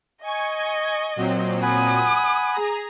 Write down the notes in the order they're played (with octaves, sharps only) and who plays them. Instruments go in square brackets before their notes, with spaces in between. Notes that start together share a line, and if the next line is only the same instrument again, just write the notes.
[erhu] D#5 [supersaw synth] G#5 C#6 G#6
[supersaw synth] A#2 F#3 C4
[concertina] F#5 G#5 B5 [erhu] D#6
[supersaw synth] G#4 A#5